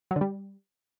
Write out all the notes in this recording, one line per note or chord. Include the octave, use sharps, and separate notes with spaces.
F#3
D3
G3